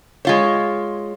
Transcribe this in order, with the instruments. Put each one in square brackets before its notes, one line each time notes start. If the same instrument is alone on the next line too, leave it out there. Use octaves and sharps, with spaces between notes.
[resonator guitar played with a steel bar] G#3 F4 C#5